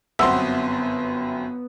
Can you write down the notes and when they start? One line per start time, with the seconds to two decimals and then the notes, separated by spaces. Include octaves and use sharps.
0.19 G1 F#2 B3 C4 E5 F#5 C6 E6